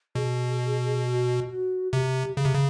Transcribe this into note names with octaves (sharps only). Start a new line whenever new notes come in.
B2 G#4
F#4
F#4
C3 G4
C#3
C3
C#3